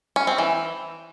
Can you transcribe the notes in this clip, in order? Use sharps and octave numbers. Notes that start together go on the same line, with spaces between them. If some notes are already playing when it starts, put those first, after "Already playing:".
C#4
C4
E3